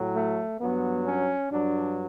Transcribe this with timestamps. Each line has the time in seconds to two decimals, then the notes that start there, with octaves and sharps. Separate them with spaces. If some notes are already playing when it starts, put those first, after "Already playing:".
Already playing: A2 F#3
0.14 A3
0.60 G2 F#3 B3
1.05 C#4
1.50 G2 F#3 D4